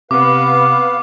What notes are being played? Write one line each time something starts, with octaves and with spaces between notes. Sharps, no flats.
C3 B3 B4 F5 D6